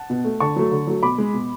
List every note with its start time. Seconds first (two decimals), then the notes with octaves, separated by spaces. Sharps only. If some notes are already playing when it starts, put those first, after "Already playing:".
Already playing: F#5 A5
0.10 B2
0.25 A3
0.40 D3 A5 C#6
0.56 F#3 A3
0.71 D3
0.87 F#3 A3
1.03 B2 B5 D6
1.18 G#3
1.33 B2